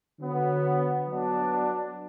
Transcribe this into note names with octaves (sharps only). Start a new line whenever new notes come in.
D3 F#3 B3
F#3 B3 D4